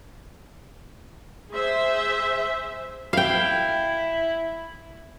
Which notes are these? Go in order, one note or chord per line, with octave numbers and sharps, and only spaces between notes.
G#4 C5 E5
E4 F5 G5